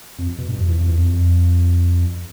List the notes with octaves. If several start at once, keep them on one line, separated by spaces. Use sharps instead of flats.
F2
B2
G2
F2
E2
F2
E2
F2